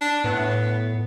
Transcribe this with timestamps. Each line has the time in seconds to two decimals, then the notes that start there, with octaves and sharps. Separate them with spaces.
0.01 D4
0.24 A2 B3